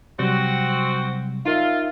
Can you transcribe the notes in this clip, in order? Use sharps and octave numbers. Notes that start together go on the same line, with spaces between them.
C3 F#3 G3 C4 F#4
D#4 F4 A#4 E5